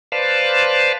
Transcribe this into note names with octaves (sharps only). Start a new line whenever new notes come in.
B4 C5 D5 F5 A5